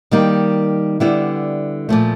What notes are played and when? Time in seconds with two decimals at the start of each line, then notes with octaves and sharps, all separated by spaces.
0.11 D#3 G3 A#3 D#4
1.00 D3 G3 B3 E4
1.89 A#2 F3 A3